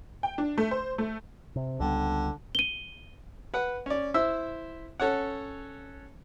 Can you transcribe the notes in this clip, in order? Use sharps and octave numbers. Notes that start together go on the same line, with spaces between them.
G5
D4
A3
C5
A3
C3
C#2 D3 G3 B3
D#7 G7
B4 F#5
C#4 D5
E4 C5 E5 E6
C#4 A4 C#5 F#5